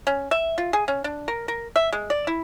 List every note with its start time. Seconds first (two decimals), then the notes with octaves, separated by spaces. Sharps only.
0.07 C#4
0.31 E5
0.58 F4
0.73 G#4
0.88 C#4
1.04 D4
1.28 A#4
1.48 A#4
1.76 E5
1.93 G#3
2.10 D5
2.27 E4